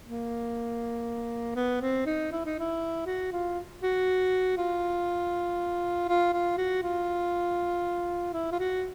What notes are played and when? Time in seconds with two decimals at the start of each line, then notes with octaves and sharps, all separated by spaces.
0.05 A#3
1.56 B3
1.81 C4
2.06 D#4
2.32 E4
2.46 D#4
2.59 E4
3.06 F#4
3.32 F4
3.83 F#4
4.57 F4
6.09 F4
6.33 F4
6.58 F#4
6.83 F4
8.33 E4
8.52 F4
8.59 F#4